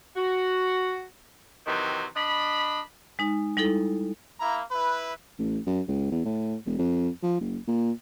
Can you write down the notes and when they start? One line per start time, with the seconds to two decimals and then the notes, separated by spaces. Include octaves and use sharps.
0.16 F#4
1.66 C3 D#3 E3 F#3
2.15 D4 D#5 B5
3.19 G#3 D#4
3.57 G3 D#4 E4 A4
4.40 A#3 E4 A#5
4.71 E4 B4
5.39 A1
5.67 F#2
5.88 C#2
6.11 E2
6.25 A2
6.65 E1
6.78 F2
7.23 F3
7.40 F#1
7.68 A#2